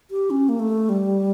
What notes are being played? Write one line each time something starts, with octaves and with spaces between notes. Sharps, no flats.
G4
C#4
A#3
A3
G3